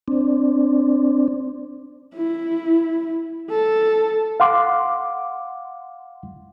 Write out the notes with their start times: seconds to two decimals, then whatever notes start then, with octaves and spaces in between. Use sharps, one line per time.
0.08 C4 D4
2.15 E4
3.50 A4
4.40 F5 F#5 C6 D6